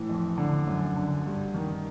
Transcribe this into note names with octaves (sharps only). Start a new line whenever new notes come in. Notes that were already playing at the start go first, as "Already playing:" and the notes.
Already playing: A2 E3
F2
D3
F#2
D3
G2
D#3